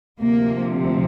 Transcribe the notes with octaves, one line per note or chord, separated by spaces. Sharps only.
D2 C3 F3 A#3